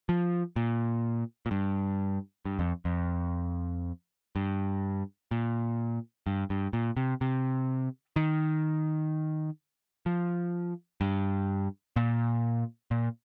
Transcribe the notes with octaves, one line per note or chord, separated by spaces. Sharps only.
F3
A#2
A#2
G2
G2
F2
F2
G2
A#2
G2
G2
A#2
C3
C3
D#3
F3
G2
A#2
A#2